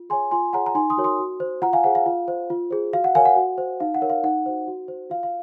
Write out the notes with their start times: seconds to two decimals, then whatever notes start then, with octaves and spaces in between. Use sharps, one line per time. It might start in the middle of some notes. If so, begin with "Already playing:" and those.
Already playing: F4
0.10 G#4 C#5 G#5 C6
0.31 F4 G#5 C6
0.53 G#4 C#5 F#5 A#5
0.66 A#5
0.75 D#4 G#5 C6
0.90 C6 D#6
0.98 F#4 A#4 C#5
1.04 C6 D#6
1.18 F#4
1.40 C5
1.62 F4 F#5 A#5
1.73 F5 G#5
1.84 G#4 C5 F#5
1.95 F5
2.06 F4
2.28 C5
2.50 F4
2.71 G#4 C5
2.93 F#4 F5
3.04 F#5
3.15 A#4 C#5 F5 G#5
3.25 F#5
3.36 F#4
3.58 C5
3.80 D#4 F5
3.95 F#5
4.02 A#4 C#5
4.10 F5
4.24 D#4 F#5
4.46 F#4 C5
4.68 F#4
4.88 C5
5.10 F4 F5
5.23 F5